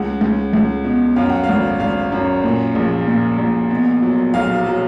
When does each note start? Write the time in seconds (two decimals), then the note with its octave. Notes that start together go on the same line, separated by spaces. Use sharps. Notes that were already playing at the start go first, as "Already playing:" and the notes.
Already playing: C#2 F#5
0.21 C#2
0.53 C#2
0.85 B2
1.16 F#2 F5
1.30 F#5
1.44 F5
1.49 G#1
1.80 G#1 F5
2.12 F#2
2.44 A#2
2.75 A#1
3.07 A#2
3.38 A#1
3.71 B2
4.02 F#3
4.34 B1 F5
4.66 F#3